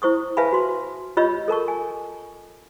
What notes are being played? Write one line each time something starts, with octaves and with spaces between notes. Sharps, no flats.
E4 C5 C#6 D#6
B4 E5 F5 G#5 A5 B5
F#4 C6
F4 G4 C#5 D#5 B5 E6
A4 A#4 A5 C#6
G#5